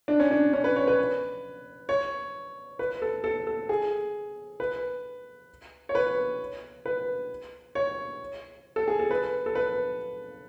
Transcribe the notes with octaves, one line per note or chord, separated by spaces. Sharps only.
D4
C#4
D4
C#4
B4
C#5
B4
C#5
B4
A4
A4
A4
G#4
B4
C#5
B4
B4
C#5
A4
G#4
A4
B4
A4
B4